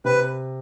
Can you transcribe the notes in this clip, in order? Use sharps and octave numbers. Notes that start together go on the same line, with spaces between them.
C3 B4